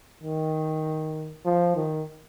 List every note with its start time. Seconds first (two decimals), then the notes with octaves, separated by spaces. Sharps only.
0.23 D#3
1.45 F3
1.76 D#3